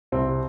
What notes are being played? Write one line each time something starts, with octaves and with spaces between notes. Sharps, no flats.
C2 C4
C3